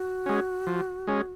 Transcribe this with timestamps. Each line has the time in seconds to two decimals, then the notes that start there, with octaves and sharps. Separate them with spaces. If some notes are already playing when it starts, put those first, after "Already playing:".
Already playing: F#4
0.26 G#3 C#4
0.67 F3
1.07 G#3 C#4